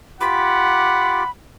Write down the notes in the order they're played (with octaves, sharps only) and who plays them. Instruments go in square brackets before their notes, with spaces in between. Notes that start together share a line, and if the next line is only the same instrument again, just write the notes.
[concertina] F4 G4 D6 [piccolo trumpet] F#5 [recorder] B5